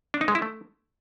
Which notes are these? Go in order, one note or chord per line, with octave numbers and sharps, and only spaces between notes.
D4
D#4
G#3
E4
A3